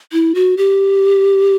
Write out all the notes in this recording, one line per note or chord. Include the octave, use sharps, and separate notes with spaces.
E4
F#4
G4